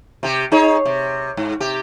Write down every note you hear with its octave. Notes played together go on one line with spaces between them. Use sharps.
C3 G4
D#4 G#4 C#5
C3
G#2
C3 G4